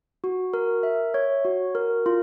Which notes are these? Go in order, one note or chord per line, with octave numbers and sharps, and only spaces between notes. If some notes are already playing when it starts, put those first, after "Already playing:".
F#4
A#4
E5
C#5
F#4
A#4
F4